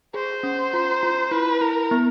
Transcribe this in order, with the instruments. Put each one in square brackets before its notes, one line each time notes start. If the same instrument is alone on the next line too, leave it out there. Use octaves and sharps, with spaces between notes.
[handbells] G#4 [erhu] C5
[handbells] C#4
F4
F4
[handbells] E4 [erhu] B4
[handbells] E4 [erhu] A#4
[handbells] B3